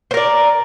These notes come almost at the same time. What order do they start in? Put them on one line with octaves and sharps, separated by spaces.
C5 A#4 D5